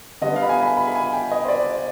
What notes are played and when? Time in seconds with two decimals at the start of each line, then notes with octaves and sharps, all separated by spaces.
0.21 D3 G3 B3 D#5
0.36 F5
0.43 B5
0.49 G#5
0.63 B5
0.77 B5
0.87 B5
0.95 G#5
1.12 G5
1.31 D#5
1.45 C5
1.48 D5